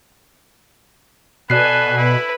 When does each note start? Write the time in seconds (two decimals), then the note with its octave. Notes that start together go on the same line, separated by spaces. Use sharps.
1.50 B2 A4 B4 D5 G#5 F#6 C7
1.98 E4 B4